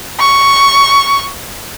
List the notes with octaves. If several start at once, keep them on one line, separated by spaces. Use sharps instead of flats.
C#6